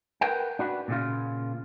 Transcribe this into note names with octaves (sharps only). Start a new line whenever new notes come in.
A#4 B4 F#5 G5
D4 F#4 B4
A#2 C#3 F4